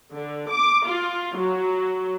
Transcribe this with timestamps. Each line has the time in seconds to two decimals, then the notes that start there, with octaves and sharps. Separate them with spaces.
0.13 D3
0.49 D6
0.85 F4
1.36 F#3